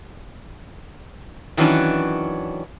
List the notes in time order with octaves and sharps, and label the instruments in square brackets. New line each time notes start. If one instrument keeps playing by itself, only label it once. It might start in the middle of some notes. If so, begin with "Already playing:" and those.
[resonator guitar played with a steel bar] D#3 E3 F#3 C#4 D4